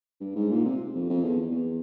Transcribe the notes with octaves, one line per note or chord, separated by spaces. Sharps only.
G2
G#2
A#2
C3
F2
F2
E2
E2